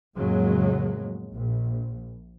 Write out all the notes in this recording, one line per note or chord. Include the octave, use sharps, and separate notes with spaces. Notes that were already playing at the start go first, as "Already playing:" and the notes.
F2 A2 C#3 F#3 G#3 A#3
A#1